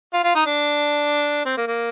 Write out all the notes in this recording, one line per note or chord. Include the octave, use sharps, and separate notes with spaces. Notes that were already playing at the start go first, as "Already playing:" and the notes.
F4
F4
D#4
D4
C4
A#3
A#3